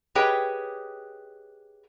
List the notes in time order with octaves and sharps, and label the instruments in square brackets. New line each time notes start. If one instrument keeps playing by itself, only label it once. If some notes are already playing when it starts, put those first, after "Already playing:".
[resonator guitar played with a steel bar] G4 G#4 B4 C#5 D#5 G5